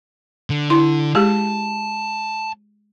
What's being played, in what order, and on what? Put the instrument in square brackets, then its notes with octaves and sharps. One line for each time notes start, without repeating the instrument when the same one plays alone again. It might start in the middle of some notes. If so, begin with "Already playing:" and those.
[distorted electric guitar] D3
[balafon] E4 C6
[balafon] G#3 G4 G#4 [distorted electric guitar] A5